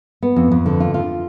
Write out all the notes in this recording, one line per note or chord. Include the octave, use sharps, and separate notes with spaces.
B3
F2
F2
D3
F4
F4